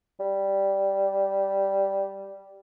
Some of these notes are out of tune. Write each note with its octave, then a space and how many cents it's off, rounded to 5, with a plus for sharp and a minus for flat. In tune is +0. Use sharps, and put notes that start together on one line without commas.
G3 -5